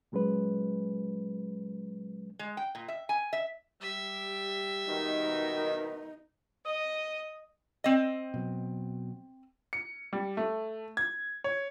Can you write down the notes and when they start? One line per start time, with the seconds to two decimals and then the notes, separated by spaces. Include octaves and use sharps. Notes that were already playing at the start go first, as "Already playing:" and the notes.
0.12 A#2 F#3 G#3 C#4 B4
2.39 G#3
2.57 G5
2.75 A#2
2.88 E5
3.09 G#5
3.33 E5
3.81 G3 E5
4.88 B2 D#3 D#4
6.66 D#5 D#6
7.84 C4 D#5
8.34 B2 F#3
9.73 C#7
10.13 G3
10.37 A3
10.97 G#6
11.44 C#5